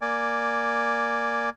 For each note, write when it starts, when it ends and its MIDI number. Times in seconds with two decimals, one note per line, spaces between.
0.01 1.50 58
0.01 1.50 74
0.01 1.50 80